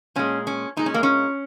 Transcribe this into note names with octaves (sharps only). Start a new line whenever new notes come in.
A#2 G#3 C#4
C#4
A#2 G#3 D#4
C#4
A#3
C#4